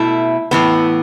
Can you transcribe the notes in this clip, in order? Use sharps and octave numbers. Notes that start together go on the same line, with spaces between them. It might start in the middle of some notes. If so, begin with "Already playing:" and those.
Already playing: B2 A3 E4
A2 E3 B3